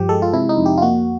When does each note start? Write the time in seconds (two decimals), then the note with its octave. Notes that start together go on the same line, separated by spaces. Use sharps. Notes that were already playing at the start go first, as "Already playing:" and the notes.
Already playing: G2 F3 G4
0.09 G#3 A4
0.22 F4
0.33 C3 E4
0.49 D#4
0.57 F2
0.66 G4
0.78 F4
0.82 A#3 F#4